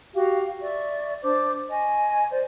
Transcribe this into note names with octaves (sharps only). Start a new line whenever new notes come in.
F#4 G4 F5
D5 E5 C#6
D4 C5 D6
D#5 G#5 C#6
C5 D5